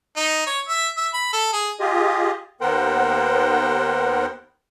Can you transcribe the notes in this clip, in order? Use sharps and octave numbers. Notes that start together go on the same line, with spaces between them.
D#4
C#5
E5
E5
B5
A4
G#4
F4 G4 G#4 D#5
D#2 B3 A#4 C5 F#5 G5